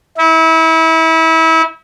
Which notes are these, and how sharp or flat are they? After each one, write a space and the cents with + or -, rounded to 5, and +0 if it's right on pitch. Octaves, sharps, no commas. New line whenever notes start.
E4 -30